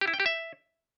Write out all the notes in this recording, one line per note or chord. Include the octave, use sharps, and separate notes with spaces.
G4
E4
G5
G4
E5